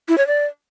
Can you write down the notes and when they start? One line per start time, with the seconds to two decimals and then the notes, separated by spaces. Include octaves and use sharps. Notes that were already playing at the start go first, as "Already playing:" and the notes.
0.09 E4
0.18 C#5
0.27 D5